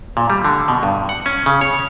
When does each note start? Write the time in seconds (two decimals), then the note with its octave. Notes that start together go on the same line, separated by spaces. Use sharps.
0.17 A#2
0.30 G3
0.45 D3
0.68 B2
0.83 G2
1.09 F#5
1.26 C#4
1.46 C#3
1.61 C#5